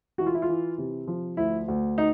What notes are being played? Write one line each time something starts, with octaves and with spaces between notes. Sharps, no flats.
E3 F#4
F4
E4
F4
E3
C3
F3
D2 E4
D2
D#4